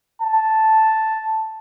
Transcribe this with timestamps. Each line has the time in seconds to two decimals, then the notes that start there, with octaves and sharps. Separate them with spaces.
0.22 A5